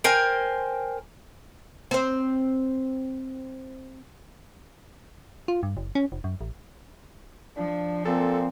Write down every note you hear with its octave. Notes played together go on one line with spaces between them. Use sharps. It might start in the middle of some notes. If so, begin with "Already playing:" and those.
A#4 C5 G5 G#5
C4 C5
F4
G2
F#1
C#4
F1
F#2
A1
F3 D4
A#2 C4 A4